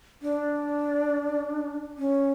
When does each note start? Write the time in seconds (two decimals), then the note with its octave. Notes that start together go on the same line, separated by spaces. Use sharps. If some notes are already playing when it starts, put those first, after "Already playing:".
0.22 D4
1.98 C#4